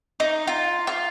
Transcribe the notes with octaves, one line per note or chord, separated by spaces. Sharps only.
D#4
F4
F4